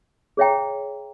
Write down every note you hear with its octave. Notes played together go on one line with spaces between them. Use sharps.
G#4 C#5 E5 G5 A#5